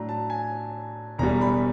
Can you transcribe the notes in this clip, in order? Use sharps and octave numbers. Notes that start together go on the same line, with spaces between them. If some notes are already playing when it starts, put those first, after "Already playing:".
Already playing: A2 F#3 A3 D4 A#5
A5
G#5
E1 E2 B2 G3 A#5
B5